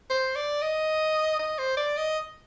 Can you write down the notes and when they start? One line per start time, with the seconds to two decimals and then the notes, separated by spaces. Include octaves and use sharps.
0.10 C5
0.35 D5
0.62 D#5
1.39 D#5
1.58 C5
1.77 D5
1.97 D#5